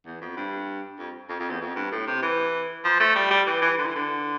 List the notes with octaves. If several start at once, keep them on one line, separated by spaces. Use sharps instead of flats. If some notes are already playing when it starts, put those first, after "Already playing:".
E2
F2
G2
F2
F2
F2
E2
F2
G2
A2
C3
E3
F3
A3
G3
G3
E3
E3
D3
E3
D3